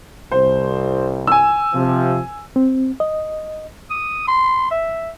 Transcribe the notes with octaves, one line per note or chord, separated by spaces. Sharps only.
C2 C5
G#5 E6
C3 F3
C4
D#5
D#6
C6
E5